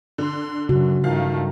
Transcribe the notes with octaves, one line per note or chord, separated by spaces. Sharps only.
D3 C6
F#2 C#3 F#4
G2 D#3 F3 A3 F5